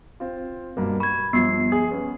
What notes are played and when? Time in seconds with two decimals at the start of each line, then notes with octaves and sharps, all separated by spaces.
0.20 C4 F4
0.77 G2 B2 A#3
1.00 B5 C#6 G#6
1.33 G2 F3 B3 C7
1.72 G#4
1.91 B3 C#4